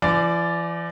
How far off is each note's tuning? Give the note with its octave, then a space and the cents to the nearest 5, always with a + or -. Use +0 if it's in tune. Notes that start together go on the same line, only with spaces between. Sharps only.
E3 +45 D5 +0